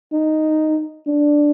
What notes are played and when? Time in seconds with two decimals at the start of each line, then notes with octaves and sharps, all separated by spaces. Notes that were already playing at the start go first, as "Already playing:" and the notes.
0.12 D#4
1.07 D4